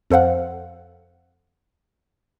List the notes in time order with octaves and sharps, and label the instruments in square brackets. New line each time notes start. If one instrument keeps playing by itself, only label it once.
[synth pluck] F2 A4 C5 F5 F#5